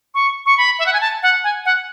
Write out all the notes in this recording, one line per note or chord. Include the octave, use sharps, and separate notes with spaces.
C#6
C#6
B5
E5
F#5
G#5
A5
F#5
G#5
F#5